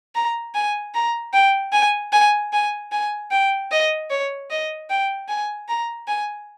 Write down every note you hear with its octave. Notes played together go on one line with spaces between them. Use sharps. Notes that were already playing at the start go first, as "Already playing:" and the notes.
A#5
G#5
A#5
G5
G#5
G#5
G#5
G#5
G5
D#5
C#5
D#5
G5
G#5
A#5
G#5